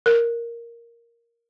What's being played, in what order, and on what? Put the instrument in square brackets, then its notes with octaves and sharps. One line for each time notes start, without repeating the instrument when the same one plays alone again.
[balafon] A#4